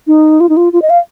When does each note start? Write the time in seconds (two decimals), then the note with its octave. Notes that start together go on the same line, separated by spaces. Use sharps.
0.07 D#4
0.40 F4
0.49 D#4
0.57 F4
0.73 F4
0.82 D#5
0.90 F5